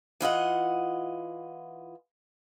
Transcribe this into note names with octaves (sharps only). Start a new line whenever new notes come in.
E3 F4 D#5 F#5